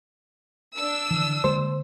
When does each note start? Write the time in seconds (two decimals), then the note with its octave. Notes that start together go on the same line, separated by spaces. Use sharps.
0.75 D4 E6
1.11 D3 E3
1.44 D3 G#3 A#3 C5